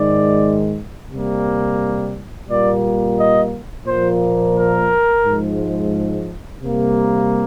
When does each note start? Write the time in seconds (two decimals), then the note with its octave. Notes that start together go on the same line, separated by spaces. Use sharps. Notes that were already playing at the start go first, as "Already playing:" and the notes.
Already playing: G#2 D#3 G#3 D5
1.11 C3 G3 A#3
2.49 A#2 G3 A#3 D5
3.18 D#5
3.87 A#2 F3 A#3 C5
4.56 A#4
5.26 G#2 F3 G#3
6.63 C3 G3 A#3